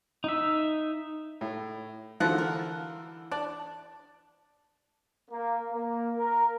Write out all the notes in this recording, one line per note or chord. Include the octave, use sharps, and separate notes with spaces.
D#4 E5
A2
D3 E3 F3 F#4 F#5
A#4
D4 D5
A#3
A#3
A#4